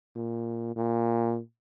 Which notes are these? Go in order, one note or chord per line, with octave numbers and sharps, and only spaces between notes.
A#2
A#2